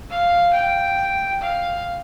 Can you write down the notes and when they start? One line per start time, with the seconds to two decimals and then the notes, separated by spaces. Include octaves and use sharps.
0.11 F5
0.54 G5
1.41 F5